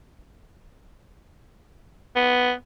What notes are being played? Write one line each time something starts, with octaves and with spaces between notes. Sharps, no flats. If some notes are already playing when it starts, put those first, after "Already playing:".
B3